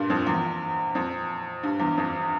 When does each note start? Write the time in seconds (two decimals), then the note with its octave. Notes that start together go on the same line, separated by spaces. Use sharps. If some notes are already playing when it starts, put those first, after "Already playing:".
Already playing: G2 A#2
0.10 F2
0.27 E2
0.95 F2
1.63 G2
1.80 E2
1.97 F2